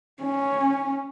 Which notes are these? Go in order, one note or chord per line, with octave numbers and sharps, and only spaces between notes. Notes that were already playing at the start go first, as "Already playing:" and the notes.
C#4